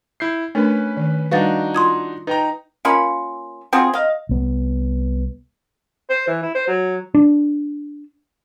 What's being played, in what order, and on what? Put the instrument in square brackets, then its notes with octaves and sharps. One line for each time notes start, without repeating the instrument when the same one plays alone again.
[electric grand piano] E4 G6 C7
[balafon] A3 D4 A#4 [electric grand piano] C#4 B4
[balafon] D#3
[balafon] G3 [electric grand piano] D4 D#4 F#4 [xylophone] B4 F5 A6
[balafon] F4 [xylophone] C6 D#6 G#6
[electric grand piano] D#4 G5 A#5 [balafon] B4
[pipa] A#3 C#4 F4 B5
C4 F4 F#4 G#4
D#5 F5
[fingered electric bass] C2 B3
[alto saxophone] C5
E3
E4
C5
F#3
[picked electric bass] D4